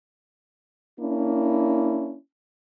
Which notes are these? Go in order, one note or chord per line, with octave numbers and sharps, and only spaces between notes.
A#3 C#4 D4 E4